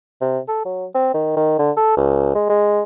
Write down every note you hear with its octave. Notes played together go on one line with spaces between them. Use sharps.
C3
A4
F#3
C4
D#3
D#3
D3
A4
C#2
G#3
G#3